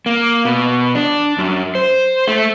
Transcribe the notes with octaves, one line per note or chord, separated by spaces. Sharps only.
A#3
B2
D4
F#2
C5
A3